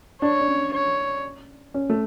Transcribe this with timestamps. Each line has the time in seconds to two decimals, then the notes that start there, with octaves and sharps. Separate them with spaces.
0.22 D4 C#5
0.41 D4
0.48 C#4
0.74 C#5
1.74 C#4
1.90 A3